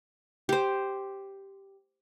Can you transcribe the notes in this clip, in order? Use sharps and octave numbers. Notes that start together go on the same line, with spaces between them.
G4 C5